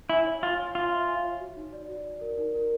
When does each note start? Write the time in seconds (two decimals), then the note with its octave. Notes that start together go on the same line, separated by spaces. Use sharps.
0.10 E4 G#5
0.27 C#5
0.42 F4 C#5
0.59 C#5
0.75 F4 G#5
0.91 E5
1.07 G#5
1.24 C#5
1.40 F#4
1.56 D#4
1.73 D5
1.89 F#4
2.05 D5
2.21 A#4
2.38 D#4
2.54 A#4